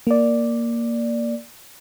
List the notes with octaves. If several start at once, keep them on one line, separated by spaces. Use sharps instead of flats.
A#3 D5